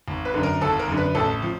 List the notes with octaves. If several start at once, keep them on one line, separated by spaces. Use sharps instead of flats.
G#1
B4
F#2 D3
A#4
G#1 A4
A#4
F#2 D3
B4
A1 A4
F3